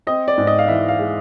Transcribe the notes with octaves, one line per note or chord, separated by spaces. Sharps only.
C4 D#5
D5
G#2
D#5
F5
E3 E5
F5
G#3